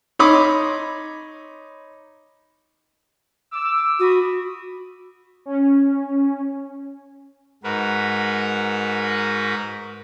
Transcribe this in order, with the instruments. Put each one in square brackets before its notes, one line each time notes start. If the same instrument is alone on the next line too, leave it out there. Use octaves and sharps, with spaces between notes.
[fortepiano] D#4 C#5 B5 C6 D6 D#6
[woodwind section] D6 E6
[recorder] F#4 [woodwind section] B5 D6 D#6
[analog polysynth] C#4
[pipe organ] G#2 F#4 A#4 B4